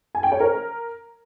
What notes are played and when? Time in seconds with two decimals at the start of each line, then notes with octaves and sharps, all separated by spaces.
0.15 G#5
0.23 G5
0.32 C#5
0.40 A#4